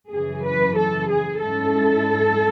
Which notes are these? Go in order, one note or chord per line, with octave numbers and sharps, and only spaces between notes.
F#2 C#3 E3 G#4
B4
A4
G#4
G#2 G#3 C#4 E4 A4